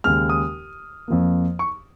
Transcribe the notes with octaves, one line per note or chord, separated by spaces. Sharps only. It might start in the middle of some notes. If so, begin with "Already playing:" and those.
D#2 C#3 G#3 F6
D#6
F2 F3 A#3
C#6